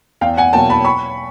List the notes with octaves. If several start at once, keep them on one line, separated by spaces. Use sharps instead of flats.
E2 F5 G5
F#5 G#5
B2 F#3 A#3 G5 A5
A5 B5
B5 C#6